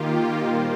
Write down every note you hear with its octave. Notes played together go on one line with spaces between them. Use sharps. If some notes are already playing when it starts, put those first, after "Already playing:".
Already playing: D#3 A#3 F4 G4
A#2 G3 A#3 C5